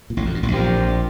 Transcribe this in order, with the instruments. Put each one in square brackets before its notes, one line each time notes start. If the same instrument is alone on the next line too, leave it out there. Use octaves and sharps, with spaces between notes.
[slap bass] A#2
A1 A2
F2
G2
A1 A2
[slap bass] A#1 A#2 [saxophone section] F3 C4 G4 A#4